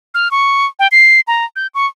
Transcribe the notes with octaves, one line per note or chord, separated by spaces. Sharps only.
F6
C#6
G5
C7
A#5
G6
C#6